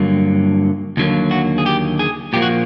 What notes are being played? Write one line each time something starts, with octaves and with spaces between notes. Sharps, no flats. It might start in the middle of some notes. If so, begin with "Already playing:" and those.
Already playing: G2 D3 F#3 A#3
D#2 D3 F#3 A#3
F#4
G#4
G4
G#4
A#2 F3 A#3 G4
F#4